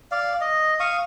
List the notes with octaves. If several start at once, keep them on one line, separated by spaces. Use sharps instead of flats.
D5 F5
D#5
F5 C#6 D#6